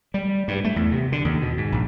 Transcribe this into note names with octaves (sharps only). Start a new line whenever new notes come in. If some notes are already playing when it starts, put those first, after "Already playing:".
G3
G2
A3
E2
C3
D3
D#2
B2
G#2
A#1